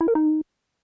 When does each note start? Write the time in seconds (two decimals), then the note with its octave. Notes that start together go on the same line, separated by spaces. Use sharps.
0.01 E4
0.08 A#4
0.15 D#4